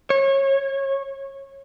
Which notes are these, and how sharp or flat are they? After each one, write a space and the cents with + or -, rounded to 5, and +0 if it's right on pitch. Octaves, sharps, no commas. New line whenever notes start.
C#5 -25